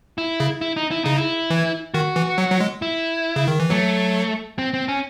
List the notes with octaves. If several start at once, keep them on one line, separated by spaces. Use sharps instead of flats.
E4
C#3
E4
D#4
E4
C#3 D#4
E4
E3
D#3 F#4
E3
F#3
F#3
G#3
E4
C#3
D#3
E3
F#3 A3
C4
C4
C#4